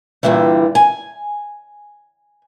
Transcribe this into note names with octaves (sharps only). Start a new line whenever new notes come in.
G2 A#2 D3 E3 G3
G#5